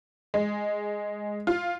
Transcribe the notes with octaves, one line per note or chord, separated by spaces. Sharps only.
G#3
F4